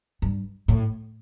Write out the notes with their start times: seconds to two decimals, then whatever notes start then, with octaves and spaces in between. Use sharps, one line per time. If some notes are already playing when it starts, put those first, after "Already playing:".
0.22 G2
0.68 A2